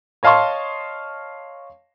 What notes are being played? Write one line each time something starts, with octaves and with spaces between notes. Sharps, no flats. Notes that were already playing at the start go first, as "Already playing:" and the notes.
C#5 D#5 F5 A5 C6 C#6